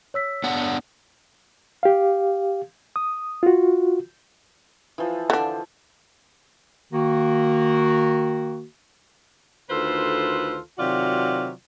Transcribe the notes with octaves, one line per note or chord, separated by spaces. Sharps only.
C#5 E6 B6
B3 D4 F#5
G4 F5
D#6
F4 F#4
E3 F3
D3 D4
D#3 A#3 F#4
D2 D#3 F4 A4 B4 C5
C3 D#3 F#3 F4 F#4 D5